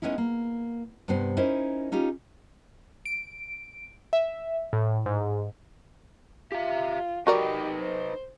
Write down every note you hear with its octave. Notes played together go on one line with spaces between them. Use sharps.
G#3 A3 B3 C#4 D#4 E4
A#3
G2 C3 B3 C5
C#4 D#4 E4 A#4 C5 D#5
C#4 D#4 F4 G4
D7
E5
A2
G#2
F4 G4 E5
D#4 F#4 G4 A#4 B4 D5 D#5
C5